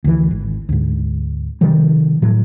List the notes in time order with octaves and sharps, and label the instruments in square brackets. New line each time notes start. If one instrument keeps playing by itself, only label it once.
[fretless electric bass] D2 E3
G#1
D2 G#2
C3 D#3 F3 G3
A2 F#3